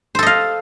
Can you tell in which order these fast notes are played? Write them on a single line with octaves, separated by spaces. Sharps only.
C5 A4 D#5 F5